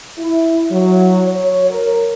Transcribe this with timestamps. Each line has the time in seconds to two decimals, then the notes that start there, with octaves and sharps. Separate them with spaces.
0.18 E4
0.71 F#3
1.28 C#5
1.70 A#4